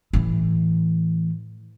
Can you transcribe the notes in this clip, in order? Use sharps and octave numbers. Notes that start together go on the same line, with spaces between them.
A2 E3